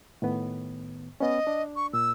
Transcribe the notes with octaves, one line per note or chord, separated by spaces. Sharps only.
A2 D#3 B3
B3 C#4 D#5
D4
C#6
A#2 E6